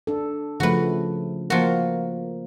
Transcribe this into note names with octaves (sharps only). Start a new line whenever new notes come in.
D4 A4
C#3 F3 A3 F#4 B4
F3 A#3 F#4 A#4